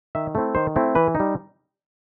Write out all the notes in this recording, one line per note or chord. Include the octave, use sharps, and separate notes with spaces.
D#3 E5
A3 C4 E4
D#3 C5
A3 C4 E4
E3 B4
D#4
G3